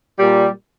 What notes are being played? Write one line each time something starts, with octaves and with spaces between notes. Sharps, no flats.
A#2 G3